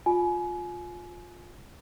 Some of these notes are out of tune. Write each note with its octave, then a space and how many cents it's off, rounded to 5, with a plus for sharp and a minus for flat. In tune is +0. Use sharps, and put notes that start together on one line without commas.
F4 +15 G#5 +30